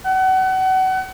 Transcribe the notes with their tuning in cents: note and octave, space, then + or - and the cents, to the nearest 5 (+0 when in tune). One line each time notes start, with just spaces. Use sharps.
F#5 +30